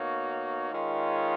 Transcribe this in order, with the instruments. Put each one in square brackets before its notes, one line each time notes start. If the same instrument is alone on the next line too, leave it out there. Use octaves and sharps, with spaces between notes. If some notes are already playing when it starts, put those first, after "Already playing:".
Already playing: [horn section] B2 A#3 D#4 F#4 C#5
D#3 G#3 C#4 F4